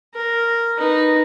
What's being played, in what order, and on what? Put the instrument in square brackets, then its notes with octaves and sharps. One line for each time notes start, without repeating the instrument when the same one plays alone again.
[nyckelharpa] A#4
D#4 B4